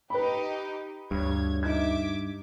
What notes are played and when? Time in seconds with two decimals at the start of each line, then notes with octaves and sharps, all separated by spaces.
0.10 D#4 G4 B4 B5
1.11 D2 G2 C#5 G#6
1.63 D#4 E5 D6 G#6